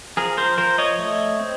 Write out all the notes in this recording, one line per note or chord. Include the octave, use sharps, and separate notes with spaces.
F3 G#4 A#4
A#4 C5
F3 A#4 C5
C#5 D#5
A3
C4